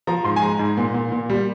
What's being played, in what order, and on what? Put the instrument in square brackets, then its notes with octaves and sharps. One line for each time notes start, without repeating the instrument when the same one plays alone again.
[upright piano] F3 A#5
G#2 C6
G#5
G#3 A#5
G#2
A#2
A#2
A#2
G3